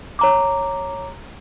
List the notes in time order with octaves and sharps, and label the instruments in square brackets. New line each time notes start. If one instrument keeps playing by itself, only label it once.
[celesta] C#5 A#5 D6